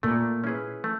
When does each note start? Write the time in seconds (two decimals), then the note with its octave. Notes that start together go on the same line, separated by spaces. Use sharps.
0.03 A#2 A3
0.44 C#4 E4 G#4 B4
0.84 A3